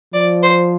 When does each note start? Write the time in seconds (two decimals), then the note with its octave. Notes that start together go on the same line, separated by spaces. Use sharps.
0.14 F3 D5
0.43 C5